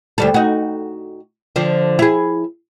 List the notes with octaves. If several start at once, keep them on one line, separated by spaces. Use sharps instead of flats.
D2 G3 A4
D#4 F#4
D3 F3
E4 G#4